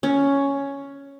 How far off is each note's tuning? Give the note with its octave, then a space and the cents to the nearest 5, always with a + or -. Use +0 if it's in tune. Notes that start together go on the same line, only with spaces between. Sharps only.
C#4 +5